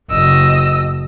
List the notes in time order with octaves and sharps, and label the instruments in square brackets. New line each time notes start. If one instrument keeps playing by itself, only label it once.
[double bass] F#1 [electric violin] D#5 E6